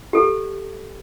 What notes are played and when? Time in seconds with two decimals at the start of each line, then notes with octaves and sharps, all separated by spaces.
0.13 G4 A4